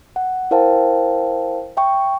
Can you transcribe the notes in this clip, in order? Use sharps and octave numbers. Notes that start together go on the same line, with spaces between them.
F#5
E4 A#4 C5 F5 G5 A5
E5 G5 C#6